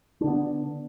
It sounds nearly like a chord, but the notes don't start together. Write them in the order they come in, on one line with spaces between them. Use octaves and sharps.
D4 D3 B3